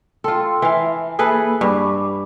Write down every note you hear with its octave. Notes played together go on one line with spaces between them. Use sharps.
F4 A4 G5 C6 E6
E3 E5 F5 G#5
A#3 G#4 A4 B4 B5
G2 B5 D6